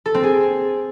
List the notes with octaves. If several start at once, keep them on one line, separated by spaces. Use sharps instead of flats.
A4
C4
G#4